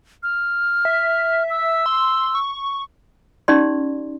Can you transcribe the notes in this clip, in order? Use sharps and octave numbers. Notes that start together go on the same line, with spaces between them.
F6
E5
E6
C6
C#6
C#4 D#4 G4 D5 C6